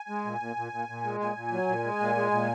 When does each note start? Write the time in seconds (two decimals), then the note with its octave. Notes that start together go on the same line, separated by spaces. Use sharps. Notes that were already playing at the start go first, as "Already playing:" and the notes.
Already playing: G#5
0.09 G#3
0.25 A#2
0.40 A#2
0.56 A#2
0.72 A#2
0.88 A#2
1.04 G#3
1.20 A#2 G#5
1.36 A#2
1.52 F#3
1.68 A#2
1.84 G#3
2.00 A#2
2.16 G#3
2.31 A#2